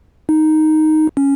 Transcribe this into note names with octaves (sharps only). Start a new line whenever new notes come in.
D#4
C#4